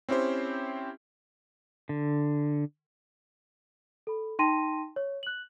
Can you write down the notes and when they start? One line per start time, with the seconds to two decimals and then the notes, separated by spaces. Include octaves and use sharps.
0.09 C4 C#4 E4 G4 C5
1.89 D3
4.07 A4 B5
4.39 D#4 G5 A5 C6 A#6 D#7
4.96 C#5
5.23 F#6 F#7